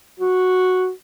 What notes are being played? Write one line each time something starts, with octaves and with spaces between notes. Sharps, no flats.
F#4